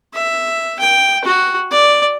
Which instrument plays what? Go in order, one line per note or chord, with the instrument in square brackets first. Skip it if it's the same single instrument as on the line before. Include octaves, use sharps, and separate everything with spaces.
[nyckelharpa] E5
G5
F#4
D5